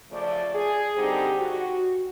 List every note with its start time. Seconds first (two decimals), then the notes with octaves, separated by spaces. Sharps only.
0.11 C#3 F3 A3 D5
0.54 G#4
0.97 D3 G3 C4 D#4 G4
1.39 F#4